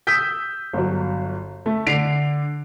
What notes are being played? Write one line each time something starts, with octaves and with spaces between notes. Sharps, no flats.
D#6 E6 G6 B6
G1 F#3
A3
D3 C7 D7 F7